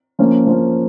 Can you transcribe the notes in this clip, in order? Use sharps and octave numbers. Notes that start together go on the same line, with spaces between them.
F3 A#3 C#4
F3 A#3 C#4